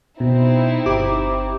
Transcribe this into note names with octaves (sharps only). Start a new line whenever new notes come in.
B2 C4 D#4 E4
G1 G4 D6